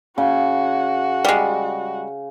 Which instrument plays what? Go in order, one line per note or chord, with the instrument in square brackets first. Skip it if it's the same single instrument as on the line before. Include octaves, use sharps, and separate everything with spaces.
[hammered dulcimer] C#3 [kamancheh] F#4
[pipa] G3 G#3